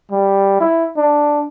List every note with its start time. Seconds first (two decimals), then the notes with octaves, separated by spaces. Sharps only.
0.12 G3
0.60 E4
0.97 D4